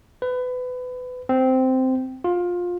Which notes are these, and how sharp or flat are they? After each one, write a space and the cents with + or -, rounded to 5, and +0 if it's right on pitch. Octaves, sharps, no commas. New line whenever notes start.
B4 +25
C4 -10
F4 +20